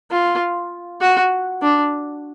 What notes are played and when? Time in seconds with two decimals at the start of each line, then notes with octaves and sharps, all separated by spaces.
0.11 F4
1.01 F#4
1.62 D4